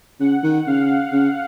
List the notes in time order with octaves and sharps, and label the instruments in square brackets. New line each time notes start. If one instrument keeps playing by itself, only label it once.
[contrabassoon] C#3 [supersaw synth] F#5
[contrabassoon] D#3
[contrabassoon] C#3 [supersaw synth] F5
[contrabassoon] C#3